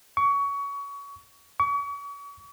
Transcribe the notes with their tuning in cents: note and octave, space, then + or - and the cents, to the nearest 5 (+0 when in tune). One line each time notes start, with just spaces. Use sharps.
C#6 +25
C#6 +40